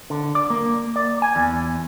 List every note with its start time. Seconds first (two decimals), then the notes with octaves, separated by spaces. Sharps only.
0.10 D3
0.35 D5
0.50 A#3
0.96 D5
1.22 G#5
1.36 E2